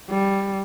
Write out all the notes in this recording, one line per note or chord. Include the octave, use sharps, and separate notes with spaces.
G3